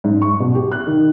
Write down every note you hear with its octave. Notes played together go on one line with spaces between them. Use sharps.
G#2
C#6
B2
G4
F#6
D#3